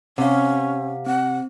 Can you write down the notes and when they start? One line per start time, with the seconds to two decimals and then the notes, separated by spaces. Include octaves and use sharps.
0.18 C3 C#4 F5 F#5
1.06 C4 F#5